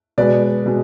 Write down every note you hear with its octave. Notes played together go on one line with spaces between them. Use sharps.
B2 G#3 B4 D5
B2 G#3